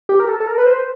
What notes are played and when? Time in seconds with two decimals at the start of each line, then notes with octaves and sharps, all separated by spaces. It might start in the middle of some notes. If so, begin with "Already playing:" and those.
0.09 G4
0.20 A#4
0.29 A4
0.40 A4
0.47 A#4
0.58 B4
0.66 C5